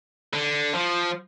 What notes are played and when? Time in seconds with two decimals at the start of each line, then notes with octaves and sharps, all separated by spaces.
0.33 D3
0.74 F3